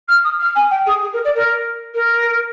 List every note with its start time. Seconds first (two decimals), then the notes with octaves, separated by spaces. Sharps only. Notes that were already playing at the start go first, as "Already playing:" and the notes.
0.08 F6
0.24 D#6
0.39 F6
0.55 G#5
0.70 G5
0.86 G#4
1.01 G#4
1.13 A#4
1.24 D5
1.35 A#4
1.94 A#4